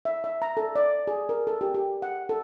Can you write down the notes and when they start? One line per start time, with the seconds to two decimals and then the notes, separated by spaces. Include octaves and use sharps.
0.05 E5
0.24 E5
0.42 A#5
0.57 A4
0.76 D5
1.07 G#4
1.29 A#4
1.47 A4
1.61 G4
1.74 G4
2.02 F#5
2.29 A4